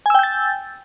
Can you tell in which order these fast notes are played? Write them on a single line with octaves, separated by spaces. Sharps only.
G#5 E6 G5 G6 A6